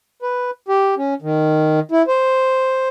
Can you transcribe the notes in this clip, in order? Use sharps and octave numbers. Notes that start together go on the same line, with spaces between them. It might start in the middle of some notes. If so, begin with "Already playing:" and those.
B4
G4
C#4
D#3
E4
C5